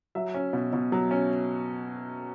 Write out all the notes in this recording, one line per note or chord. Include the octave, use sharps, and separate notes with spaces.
F#3 E5
C#4
B2
B2
F#3
C#4